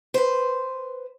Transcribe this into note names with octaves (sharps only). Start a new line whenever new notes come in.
B4 C5